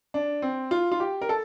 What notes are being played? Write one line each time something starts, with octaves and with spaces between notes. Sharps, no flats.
D4
C4
F4
F4
G4
A#4
A4